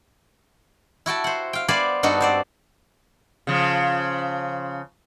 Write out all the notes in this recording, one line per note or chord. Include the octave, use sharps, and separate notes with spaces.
E4 F#4 G5 A5
C5 F#5
F5 G5
B3 C5 D5 F5 G#5 B5
G2 B3 D#4 F#4 A4
C4 C5 D5
C#3 F3